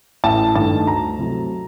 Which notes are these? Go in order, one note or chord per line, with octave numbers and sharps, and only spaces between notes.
A1 A5
G2 D#3 A3 A5
D2 A#5
C3 F#3 A3